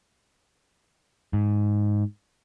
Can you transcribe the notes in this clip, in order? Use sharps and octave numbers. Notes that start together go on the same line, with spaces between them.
G#2